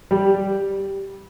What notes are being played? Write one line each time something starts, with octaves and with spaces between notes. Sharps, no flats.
G3 G4